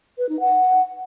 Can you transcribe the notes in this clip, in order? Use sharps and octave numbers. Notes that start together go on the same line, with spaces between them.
B4
D#4
F#5